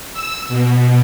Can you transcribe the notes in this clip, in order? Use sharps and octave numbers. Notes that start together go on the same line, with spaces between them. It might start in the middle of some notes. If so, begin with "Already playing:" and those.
E6
B2